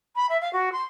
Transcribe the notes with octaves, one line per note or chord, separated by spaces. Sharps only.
B5
E5
F5
F#4
C6